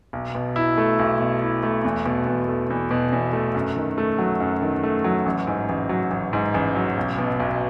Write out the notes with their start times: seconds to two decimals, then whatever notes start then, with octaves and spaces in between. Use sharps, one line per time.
0.13 B1
0.35 B2
0.56 E4
0.78 A3
0.99 B1
1.20 B2
1.42 E4
1.63 A3
1.85 E2
2.06 B2
2.27 E2
2.48 A3
2.70 E2
2.91 B2
3.12 E2
3.33 A3
3.55 F#2
3.76 D#3
3.98 A3
4.18 F#3
4.40 F#2
4.62 D#3
4.83 A3
5.04 F#3
5.26 A1
5.47 G#2
5.69 A1
5.89 F#3
6.11 A1
6.33 G#2
6.54 A1
6.75 F#3
6.97 B1
7.18 B2
7.40 B1